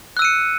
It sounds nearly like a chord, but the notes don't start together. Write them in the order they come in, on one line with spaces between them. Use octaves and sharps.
F#6 E6 D#7 C#7